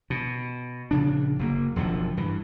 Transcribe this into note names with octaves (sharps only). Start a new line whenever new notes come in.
B2
A#1 C#3 D4
F#1 B2 A#3
E1 F#2 D3 F3
G2 E3